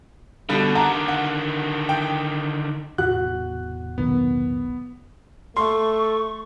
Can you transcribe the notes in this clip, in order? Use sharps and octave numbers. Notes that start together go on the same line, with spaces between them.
B2 D3 G3
D3 D#3 F#5 A5 A#5
F#5
G5
E2 A2 C3 F#4 F#6
B1 D#3 B3
A3 C6 C#6